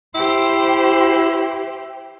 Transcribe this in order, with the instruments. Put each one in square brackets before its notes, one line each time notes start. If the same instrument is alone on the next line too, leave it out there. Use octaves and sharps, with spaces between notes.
[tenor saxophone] E4 [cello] G4 C5